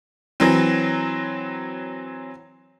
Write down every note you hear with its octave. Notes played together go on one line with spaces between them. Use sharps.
E3 F#3 C4